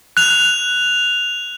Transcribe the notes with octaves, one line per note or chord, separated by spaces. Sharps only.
F#6 F7